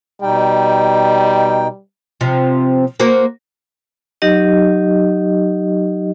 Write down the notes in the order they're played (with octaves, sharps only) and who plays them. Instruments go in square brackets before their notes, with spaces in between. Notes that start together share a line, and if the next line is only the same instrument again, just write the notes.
[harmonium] B2 D#4 G5 [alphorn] G3
[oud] C3 F3
A#3 F#4 C5
[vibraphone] F#3 D#4 G4 D#5